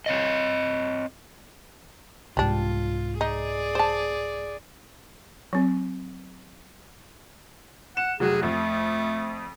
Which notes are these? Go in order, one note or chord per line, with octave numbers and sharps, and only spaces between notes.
C4 C#5 D#5
C2 G#2 G3 D4 F4
D#4 G#4 D5
C5 A5
F#3 C4
F#5 E7
F1 F#3 F#4 G#4
F2 A3